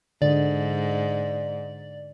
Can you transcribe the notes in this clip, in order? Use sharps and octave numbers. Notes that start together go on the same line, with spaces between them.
G#2 D3 D5